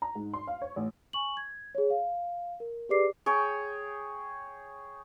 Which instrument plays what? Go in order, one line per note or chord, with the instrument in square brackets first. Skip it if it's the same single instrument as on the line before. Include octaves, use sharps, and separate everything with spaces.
[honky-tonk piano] A#5
G#2
C6
F5
C#5
A1
[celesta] G#5 C#6 F#7
G#6
G#4 C#5
F5
A#4
G4 G#4 B4 D5 D6 C7
[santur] G#4 C#5 G5